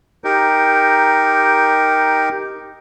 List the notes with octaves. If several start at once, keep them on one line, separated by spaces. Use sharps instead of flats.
D#4 G4 A#4